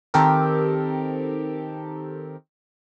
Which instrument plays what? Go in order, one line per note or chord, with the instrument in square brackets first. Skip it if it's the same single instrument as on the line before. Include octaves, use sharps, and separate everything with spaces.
[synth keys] D#3 C4 G4 A4 A#4